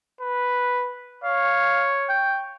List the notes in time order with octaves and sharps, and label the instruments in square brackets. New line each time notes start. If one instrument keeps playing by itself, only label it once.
[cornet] B4
[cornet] C#5 [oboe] F5
[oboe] G5